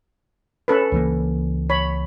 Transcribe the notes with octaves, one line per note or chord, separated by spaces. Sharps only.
C#4 A4 B4
C#2 E3 A#3
C#5 B5